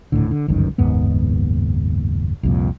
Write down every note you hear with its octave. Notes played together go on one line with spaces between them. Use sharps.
D#1 A#1 A2 D3
D3
G1 C#2 F#2 D#3
F#1 D#2 G#2 B3
C2 F2 A#2